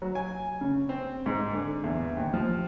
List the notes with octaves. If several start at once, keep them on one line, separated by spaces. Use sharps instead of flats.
F#3
G#5
C#3
C4
G#2
D3
E2
D#2
F3